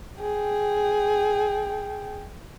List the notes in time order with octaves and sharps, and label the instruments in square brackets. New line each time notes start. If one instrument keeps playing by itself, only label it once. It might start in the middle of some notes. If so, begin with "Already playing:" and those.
[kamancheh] G#4 G5